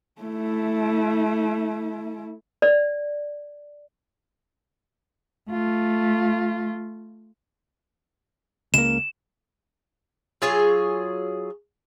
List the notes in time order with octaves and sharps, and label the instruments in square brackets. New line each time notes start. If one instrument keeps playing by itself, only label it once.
[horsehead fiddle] A3 E4
[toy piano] D5
[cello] A3 F4
[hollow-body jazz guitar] C#2 A#3 [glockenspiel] E7
[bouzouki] F#3 F4 G#4 C#5